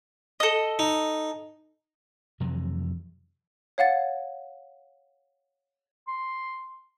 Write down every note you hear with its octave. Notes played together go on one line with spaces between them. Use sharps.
A4 D#5
D#4
F2 C3 E3 F#3
C#5 F5 F#5 A6
C6